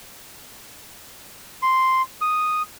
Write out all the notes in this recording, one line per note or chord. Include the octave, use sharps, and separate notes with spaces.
C6
D#6